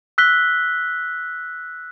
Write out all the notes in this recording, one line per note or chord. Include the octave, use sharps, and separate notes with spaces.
E6 F#6 B6 G7